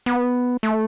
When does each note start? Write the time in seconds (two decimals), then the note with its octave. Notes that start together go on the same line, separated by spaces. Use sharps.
0.06 B3
0.63 A3